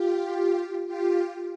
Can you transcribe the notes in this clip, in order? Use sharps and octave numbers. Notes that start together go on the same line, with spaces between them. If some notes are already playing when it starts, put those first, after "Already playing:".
Already playing: F4 G4
F4 G4